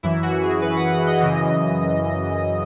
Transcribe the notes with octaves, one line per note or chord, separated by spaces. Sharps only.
F#2 E3 E4
F#4
G#4
B4
F#5
F#5
D#5
F#2 C#3 E3